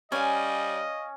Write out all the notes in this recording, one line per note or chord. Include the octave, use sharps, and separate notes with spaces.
G3 C#4 D#5 F5 G#5